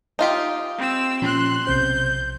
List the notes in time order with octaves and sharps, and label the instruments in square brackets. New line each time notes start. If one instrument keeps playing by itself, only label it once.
[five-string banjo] D#4 F4 G4
[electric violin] C4 E6
[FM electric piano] A#2 F3 C#4 [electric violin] C6 F#6
[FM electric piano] B1 C3 C5 [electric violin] G6